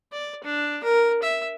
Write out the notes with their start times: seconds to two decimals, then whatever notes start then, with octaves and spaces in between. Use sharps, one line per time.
0.13 D5
0.44 D4
0.84 A#4
1.23 E5